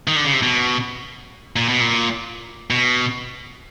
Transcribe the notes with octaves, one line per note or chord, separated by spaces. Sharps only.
D#3
D3
C#3
C3
B2
A#2
B2
A#2
B2